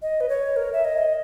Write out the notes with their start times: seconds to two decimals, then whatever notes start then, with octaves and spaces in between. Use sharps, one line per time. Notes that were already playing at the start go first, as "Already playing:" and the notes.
0.02 D#5
0.20 B4
0.29 C#5
0.56 A#4
0.73 E5
0.84 D#5